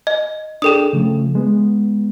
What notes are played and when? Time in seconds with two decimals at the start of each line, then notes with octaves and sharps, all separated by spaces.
0.07 D#5
0.62 D4 G#4 A4 G5 D#6
0.93 C#3 F3 A3
1.35 G#3 B3